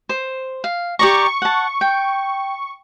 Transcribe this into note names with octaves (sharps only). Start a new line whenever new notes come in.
C5
F5
G4 D5 A#5 C#6
F#5 A5
G5